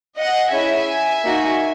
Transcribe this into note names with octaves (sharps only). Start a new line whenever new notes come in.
D#5 F#5
C#4 E4 G#4 E5 G#5
A#3 D#4 F#4